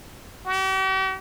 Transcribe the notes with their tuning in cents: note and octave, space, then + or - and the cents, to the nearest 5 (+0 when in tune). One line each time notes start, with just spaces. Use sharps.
G4 -45